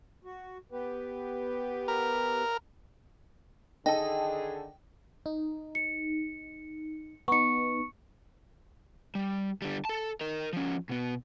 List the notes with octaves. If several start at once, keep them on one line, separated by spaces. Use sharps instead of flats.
F#4
B3 G4 B4
A#4
D3 D#3 D#4 G#4 A4 D#5 G5
D#4
C#7
B3 D#4 C#6 C#7
G3
D3 G3
A4 A5
A#4 D#5
F3 C#4
B2 B3